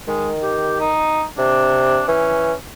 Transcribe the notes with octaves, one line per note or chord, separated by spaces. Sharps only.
D#3 G#3
G4
D#4
C3 D4
E3 C#4